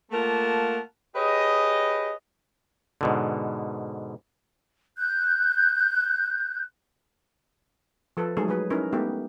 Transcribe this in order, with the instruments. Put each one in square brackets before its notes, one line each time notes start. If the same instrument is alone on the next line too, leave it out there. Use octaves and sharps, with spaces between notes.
[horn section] A3 A#3 F4 A#4 F#5 A5
G4 G#4 B4 C#5 D#5
[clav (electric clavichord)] G#2 B2 D3
[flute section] F#6 G6
[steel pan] F3 A4 B4
F#3 G#3 A3 D#4 G#4
F#3 A3 G#4 B4
C#4 D#4 E4 A#4 B4
G#3 A3 B3 D#4 G4